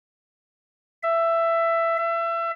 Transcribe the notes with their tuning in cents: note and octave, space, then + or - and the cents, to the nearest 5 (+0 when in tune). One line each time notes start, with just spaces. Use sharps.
E5 +15
E5 +30